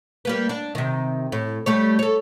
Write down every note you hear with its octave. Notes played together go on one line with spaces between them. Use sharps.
G3 A#3 B4
D4
C3 D#3
A2
G3 A3 C#5
A4 C#5